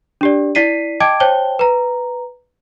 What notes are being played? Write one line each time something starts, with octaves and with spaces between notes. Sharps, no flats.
D4 G4 D5
E4 D5 B6 C7 D#7
D#5 G5 A5 D6 G#6 D7
C5 C#5 G5 A5 G7
B4 A#5